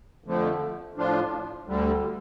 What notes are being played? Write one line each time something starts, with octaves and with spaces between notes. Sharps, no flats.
F2 D3 F3 A3
A2 F3 D4 F4
D2 D3 G3